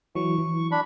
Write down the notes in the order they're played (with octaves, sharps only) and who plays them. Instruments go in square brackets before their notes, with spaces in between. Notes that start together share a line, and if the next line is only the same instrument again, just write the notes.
[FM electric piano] E3 F#3 [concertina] C#6
[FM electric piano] E3
[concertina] D4 B5